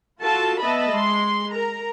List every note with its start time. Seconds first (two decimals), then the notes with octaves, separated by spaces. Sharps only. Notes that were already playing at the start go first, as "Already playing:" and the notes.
0.20 F4 F#4 A4 A5
0.59 B3 D#5 E5 A5 B5
0.92 G#3 C6
1.52 A#4 A#5